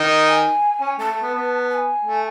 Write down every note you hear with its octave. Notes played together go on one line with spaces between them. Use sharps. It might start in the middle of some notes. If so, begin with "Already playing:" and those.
Already playing: D#3 D#4
G#5
C#4
A3 A5
A3
B3
B3
A5
G#5
A3